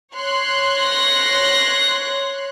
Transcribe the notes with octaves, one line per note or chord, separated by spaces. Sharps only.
C#5 C6 F#6
A#6